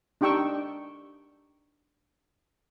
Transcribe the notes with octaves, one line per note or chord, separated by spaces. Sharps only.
D4 D#4 G4 G5 C#6 E6